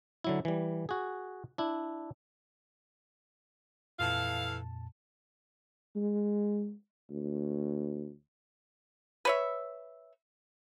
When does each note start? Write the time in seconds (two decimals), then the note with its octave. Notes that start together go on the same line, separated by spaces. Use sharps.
0.24 D3 F#3 E4
0.45 E3 G3
0.89 F#4 G#4
1.58 D4 E4
4.00 F2 A#2 E3 A4 F5 A5
5.96 G#3
7.11 D2
9.25 B4 C#5 E5